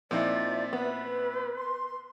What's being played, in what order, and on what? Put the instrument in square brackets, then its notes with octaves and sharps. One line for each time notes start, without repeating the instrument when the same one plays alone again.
[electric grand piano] A#2 C4 [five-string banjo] F3 D#4 E4 [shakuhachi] D5 [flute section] E5
[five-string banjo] B3 [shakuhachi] B4
[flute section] C6